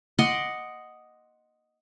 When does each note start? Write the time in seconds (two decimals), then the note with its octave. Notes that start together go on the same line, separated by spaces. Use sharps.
0.18 D#5 F#5 C6 D6